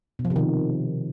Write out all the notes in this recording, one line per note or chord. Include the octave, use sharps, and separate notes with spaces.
B2
F3
C3
D#3